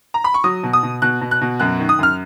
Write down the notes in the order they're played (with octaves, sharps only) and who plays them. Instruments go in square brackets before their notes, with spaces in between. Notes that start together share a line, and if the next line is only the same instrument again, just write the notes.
[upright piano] A#5
B5
C#6
F#3 D#6
B2
D#6
B2
B2 F#6
B2
F#6
B2
F#2 F#6
D#3
D#6
F#2 F6